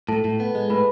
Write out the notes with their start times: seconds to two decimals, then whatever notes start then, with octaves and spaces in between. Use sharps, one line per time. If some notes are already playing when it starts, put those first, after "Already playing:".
0.08 A2 A4 A5
0.25 A2
0.40 B3
0.55 G#3
0.70 A2 B4 B5